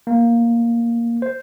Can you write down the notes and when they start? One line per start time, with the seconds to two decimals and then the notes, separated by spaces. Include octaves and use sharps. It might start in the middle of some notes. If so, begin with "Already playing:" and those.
0.07 A#3
1.22 C5